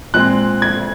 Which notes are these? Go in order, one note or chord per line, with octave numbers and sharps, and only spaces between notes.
A#2 G#3 C4 F#6
G#6